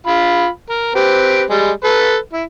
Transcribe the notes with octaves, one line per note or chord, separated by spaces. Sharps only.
F4 F5 B5
A#4
C4 G4 B4
G3 G#3
A4 B4
E4